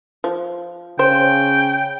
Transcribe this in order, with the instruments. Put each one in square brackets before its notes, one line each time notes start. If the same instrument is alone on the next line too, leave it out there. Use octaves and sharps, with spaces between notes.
[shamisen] F3
[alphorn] C#3 [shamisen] C5 [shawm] G5